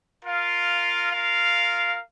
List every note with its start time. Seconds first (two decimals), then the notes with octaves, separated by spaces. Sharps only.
0.23 F4 A#4 F5
1.11 F4 A#4 F5